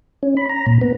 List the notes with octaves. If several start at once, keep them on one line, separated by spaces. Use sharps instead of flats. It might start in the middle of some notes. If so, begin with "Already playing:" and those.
C#4
B5
A#5
A#2
B3